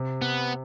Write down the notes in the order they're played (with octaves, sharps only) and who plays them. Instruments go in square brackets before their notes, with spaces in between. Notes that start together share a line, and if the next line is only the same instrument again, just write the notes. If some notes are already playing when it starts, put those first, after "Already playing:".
Already playing: [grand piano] C3
[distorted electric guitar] B3